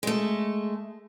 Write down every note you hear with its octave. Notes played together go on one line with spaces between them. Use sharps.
G#3 A3